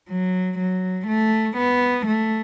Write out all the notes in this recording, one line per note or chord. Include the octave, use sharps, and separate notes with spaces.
F#3
F#3
A3
B3
A3